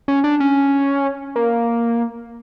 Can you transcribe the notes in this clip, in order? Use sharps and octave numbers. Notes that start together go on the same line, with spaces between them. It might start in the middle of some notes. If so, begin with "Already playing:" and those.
C#4
D4
C#4
A#3